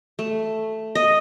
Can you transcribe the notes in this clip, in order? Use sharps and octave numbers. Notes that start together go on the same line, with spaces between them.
A3
D#5